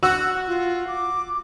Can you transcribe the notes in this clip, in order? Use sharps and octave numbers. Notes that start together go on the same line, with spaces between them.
F#4 E6
F4
D6